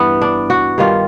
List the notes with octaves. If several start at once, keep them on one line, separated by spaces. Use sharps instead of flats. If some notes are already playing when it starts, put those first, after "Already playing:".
Already playing: G2 E3 B3
D4
F#4
G2 D#3 G3 F4